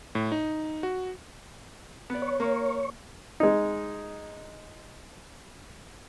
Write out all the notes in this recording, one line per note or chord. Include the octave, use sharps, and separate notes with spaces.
A2
D#4
F#4
B3 D5
C#5
A#3
G#3 D#4